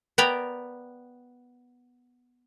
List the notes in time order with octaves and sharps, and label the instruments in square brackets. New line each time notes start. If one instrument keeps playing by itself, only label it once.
[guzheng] B3 D5 G5 A#5 B5